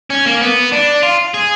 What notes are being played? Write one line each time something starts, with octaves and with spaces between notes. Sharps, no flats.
C#4
A#3
B3
D4
F4
G#4